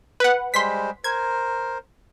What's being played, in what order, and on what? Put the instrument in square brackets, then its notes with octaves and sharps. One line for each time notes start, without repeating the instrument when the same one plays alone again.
[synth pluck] B4 F#5
[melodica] G3 G#3 C5 [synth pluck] C6 B6
[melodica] A#4 C5 [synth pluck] G#6